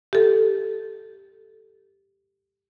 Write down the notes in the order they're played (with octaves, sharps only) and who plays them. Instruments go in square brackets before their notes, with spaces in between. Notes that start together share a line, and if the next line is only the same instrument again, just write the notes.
[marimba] G4 A4